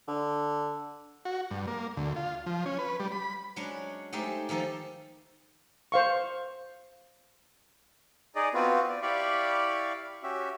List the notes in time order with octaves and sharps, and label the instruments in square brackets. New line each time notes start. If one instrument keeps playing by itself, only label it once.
[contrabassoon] D3
[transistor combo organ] F#4
G2
A#3
D2
F4
F3
C#4
B4
G3
B5
[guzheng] F#3 G#3 C#4 D4
G#3 A3 D#4 G4 C5
D#3 F3 D#4 G4 A4
[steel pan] C5 F5 C#6
[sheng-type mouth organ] D#4 G#4 D5 D#5
B3 C4 F4 F#4 B4
D5
E4 G4 D5 F5 B5 C#6
C#4 F#4 G4 E5